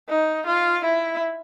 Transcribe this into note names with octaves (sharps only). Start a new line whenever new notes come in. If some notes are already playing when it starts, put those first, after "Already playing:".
D#4
F4
E4